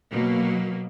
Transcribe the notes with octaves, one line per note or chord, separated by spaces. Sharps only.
B2 F#3 A#3